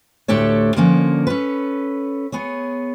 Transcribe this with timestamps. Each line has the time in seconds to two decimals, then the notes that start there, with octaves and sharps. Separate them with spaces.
0.28 D2 A2 D4 G4 A4 C#5
0.76 D3 F3 A#3 C#4 D4
1.27 C#4 A4 B4
2.32 B3 G#4 C#5